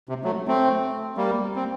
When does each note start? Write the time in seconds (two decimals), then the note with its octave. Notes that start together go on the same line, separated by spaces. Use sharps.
0.09 C3
0.24 F#3 A3
0.47 A3 C4
1.17 G3 A#3
1.55 C4